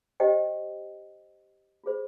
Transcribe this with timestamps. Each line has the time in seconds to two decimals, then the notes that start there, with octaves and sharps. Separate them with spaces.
0.20 D4 G4 C5 D#5 G5
1.84 F4 G#4 C5